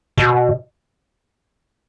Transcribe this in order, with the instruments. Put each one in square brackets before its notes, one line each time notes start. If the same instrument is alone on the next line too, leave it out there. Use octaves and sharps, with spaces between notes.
[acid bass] B2